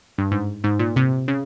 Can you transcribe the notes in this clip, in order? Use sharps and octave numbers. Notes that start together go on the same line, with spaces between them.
G2
G#2
G#2
A#2
C3
C#3